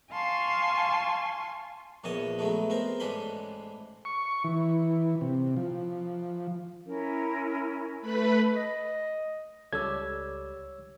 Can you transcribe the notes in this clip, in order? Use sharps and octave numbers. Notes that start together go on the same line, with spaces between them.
F5 G#5 A5 C6 C#6
A#1 E2 C#5 D#5 A5 D#6
F#3 G#3 A3 B3
B3 C4 A#4 C5
A1 G#2 C#4 D4 B5 C6
C#6
E3
C3
F3
C#4 E4 A#4
A3 B4 B5
D#5
C#2 G3 A4 C#5 E6 G#6